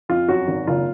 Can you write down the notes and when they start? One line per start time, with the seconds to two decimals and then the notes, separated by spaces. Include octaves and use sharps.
0.09 F2 F4
0.29 F#2 F#4
0.48 G#1
0.67 F#1 F4